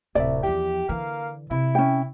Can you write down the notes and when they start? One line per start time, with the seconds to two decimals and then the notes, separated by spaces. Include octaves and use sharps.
0.15 D1 C2 C3 D5 E5
0.43 E2 F3 G4
0.89 D3 E3 A#3 F5
1.51 C3 E4
1.75 C#4 G5